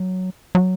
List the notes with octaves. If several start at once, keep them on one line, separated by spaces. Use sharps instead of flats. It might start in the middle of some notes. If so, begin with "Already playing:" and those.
Already playing: F#3
F#3